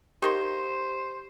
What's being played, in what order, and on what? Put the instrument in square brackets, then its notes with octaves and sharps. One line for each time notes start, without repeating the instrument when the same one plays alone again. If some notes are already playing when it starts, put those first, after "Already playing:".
[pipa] D#3 A#3 C6 [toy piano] G4 [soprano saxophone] C5